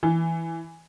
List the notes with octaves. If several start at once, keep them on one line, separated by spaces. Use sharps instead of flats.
E3